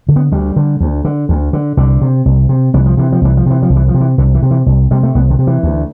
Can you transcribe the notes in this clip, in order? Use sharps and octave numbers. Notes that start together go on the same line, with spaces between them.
D3
B3
D2 G3
D3
D2
D3
D2
D3
C2 D3
C3
C2
C3
C2 E3
F3
C3 E3
F3
C2 E3
F3
C3 E3
F3
C2
E3
F3
C3
E3
C2 D3
E3
C3
E3
C2
C3 G3
A3
C2 B3
D3
C3
E3
D2